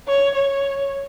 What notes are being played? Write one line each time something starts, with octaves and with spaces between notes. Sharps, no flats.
C#5
C#5